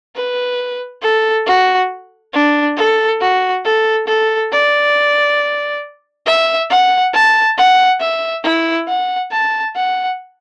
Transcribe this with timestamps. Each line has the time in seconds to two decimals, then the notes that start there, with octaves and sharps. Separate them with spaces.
0.16 B4
1.02 A4
1.46 F#4
2.33 D4
2.76 A4
3.21 F#4
3.65 A4
4.07 A4
4.52 D5
6.26 E5
6.70 F#5
7.13 A5
7.57 F#5
8.00 E5
8.44 E4
8.87 F#5
9.32 A5
9.76 F#5